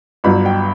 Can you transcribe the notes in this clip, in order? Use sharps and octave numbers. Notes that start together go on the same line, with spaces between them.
G1 G2 F#3 B5
G5